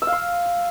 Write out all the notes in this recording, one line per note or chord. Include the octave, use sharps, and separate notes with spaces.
E6
F5
C6